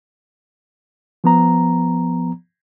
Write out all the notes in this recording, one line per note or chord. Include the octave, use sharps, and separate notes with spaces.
F3 B3 A#5